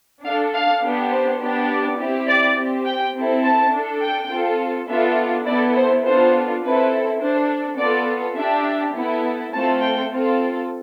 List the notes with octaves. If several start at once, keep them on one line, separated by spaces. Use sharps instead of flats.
D4 A4 F5
F5
B3 D4 G4
C5
B3 D4 G4
D5
C4 E4 G4
D5
C4 G4
G5
C4 E4 A4
A5
D4 A4
G5
C4 F4 A4
B3 D4 F4 A4 E5
B3 E4 A4 D5
C5
B3 D4 F4 A4 C5
C4 E4 A4 B4
D4 A4 C5
B3 F4 A4 D5
D4 G4 E5
B3 E4 A4
A3 C4 F4 A4 A5
G5
C4 F4 A4